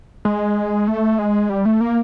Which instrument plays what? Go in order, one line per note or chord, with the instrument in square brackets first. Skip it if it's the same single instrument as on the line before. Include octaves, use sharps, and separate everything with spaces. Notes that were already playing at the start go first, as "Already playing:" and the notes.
[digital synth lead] G#3
A3
G#3
G3
A3
A#3